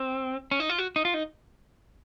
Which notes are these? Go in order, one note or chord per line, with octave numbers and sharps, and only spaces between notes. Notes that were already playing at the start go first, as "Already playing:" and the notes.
Already playing: C4
C#4
D#4
F4
F#4
D#4
F4
D#4